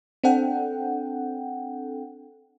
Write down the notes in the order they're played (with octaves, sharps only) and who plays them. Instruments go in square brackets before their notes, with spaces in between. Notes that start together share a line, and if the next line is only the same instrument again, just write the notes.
[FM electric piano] C4 D4 A4 F#5 G5